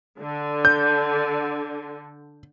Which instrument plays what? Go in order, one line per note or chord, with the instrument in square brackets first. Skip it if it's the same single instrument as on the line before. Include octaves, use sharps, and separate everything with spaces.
[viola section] D3
[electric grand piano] G6